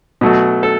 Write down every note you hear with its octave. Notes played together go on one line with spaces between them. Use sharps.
B2 F#3 A3
A4